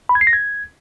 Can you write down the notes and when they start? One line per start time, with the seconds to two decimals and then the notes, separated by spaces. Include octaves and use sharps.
0.09 B5
0.15 G#6
0.21 C7
0.27 A#6
0.33 G#6